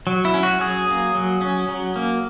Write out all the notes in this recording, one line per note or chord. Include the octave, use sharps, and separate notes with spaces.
F#3
E4
C#4
F#4
F#3 G#4
A#3
F#3
C#4
F#3
A#3